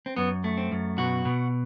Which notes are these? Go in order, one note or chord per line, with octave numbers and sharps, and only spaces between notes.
C4
F#2 B3
A3
C4
F#2
B2 F#4
B2